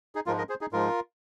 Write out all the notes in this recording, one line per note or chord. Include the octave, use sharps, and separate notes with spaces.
D#4 G#4
G#2 F3 G#3 F4 A#4
A#4 D#5
G#4 C5
D#4 G#4
G#2 F3 G#3 F4 A#4